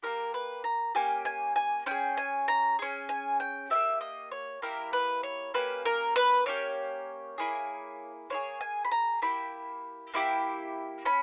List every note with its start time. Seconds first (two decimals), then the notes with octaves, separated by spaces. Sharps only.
0.03 A#3 C#4 G4 A#4
0.34 B4
0.64 A#5
0.95 A#3 C#4 G4 G#5
1.25 G#5
1.56 G#5
1.86 C#4 G#4 G5
2.17 G#5
2.48 A#5
2.79 C#4 G#4
3.09 G#5
3.40 G5
3.70 A#3 E4 G4 E5
4.01 D#5
4.32 C#5
4.62 A#3 E4 G4 A#4
4.93 B4
5.23 C#5
5.54 A#3 C#4 G4 B4
5.85 A#4
6.16 B4
6.46 A#3 C#4 G4 C#5
7.38 A#3 E4 G#4
8.30 A#3 E4 G#4 C#5
8.61 G#5
8.85 B5
8.91 A#5
9.22 A#3 E4 G4 B5
10.14 A#3 E4 G4
11.05 C#4 B5